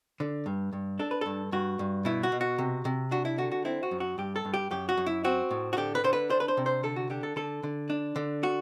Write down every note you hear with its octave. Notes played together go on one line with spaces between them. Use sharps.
D3
G2
G2
D4 A4
B4
G2 A4
G2 F#4
G2
B2 E4
F#4
B2
F#4
C3
C3
D4 F#4
E4
D3 F#4
F#4
C4 E4
F#4
F#2
F#4
G2 G4
A4
G2
G4
F#2 G4
F#4
F#2
E4
C4 F#4
A2
F#4
D3 G4
B4
D3 C5
B4
D4 C5
B4
C5
C3
C5
D3 A4
F#4
D3 G4
A4
D3 A4
D3
D4
D3
F#4